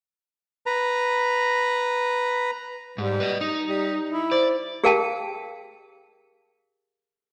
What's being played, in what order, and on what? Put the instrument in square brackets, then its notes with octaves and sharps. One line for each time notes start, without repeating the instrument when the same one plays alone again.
[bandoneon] B4 A#5
[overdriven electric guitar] G#2 [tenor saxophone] G3
[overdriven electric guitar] B4 D#5
D#4
[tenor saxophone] G3
E4
[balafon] C5 [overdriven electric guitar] D5
[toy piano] G4 G#4 A#4 F5 G5 A5